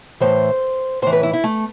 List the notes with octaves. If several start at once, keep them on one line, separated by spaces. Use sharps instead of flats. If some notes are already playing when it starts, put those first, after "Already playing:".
A2 E3 C5
A2 E3 C5
B4
E4
E4
A3